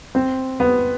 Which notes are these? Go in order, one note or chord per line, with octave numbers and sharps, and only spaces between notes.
C4
B3